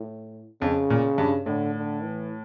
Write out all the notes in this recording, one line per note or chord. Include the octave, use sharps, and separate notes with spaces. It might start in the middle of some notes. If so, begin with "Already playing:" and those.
Already playing: A2
F2 C#3
A#2
G2
A2 D3
D3
E3